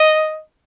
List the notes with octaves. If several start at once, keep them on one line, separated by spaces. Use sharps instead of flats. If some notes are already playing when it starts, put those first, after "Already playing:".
Already playing: D#5